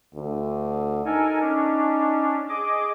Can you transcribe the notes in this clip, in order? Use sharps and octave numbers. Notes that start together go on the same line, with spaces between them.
D2
D#4 A4 A#4 G#5
C#4 D4
G#4 D#5 D6